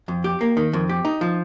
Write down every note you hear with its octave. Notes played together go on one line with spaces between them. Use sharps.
F2
G4
A#3
D#3
F2
G4
D#4
F3